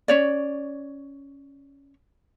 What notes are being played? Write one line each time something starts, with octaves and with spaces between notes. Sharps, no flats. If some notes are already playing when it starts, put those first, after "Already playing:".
C#4 C#5 D5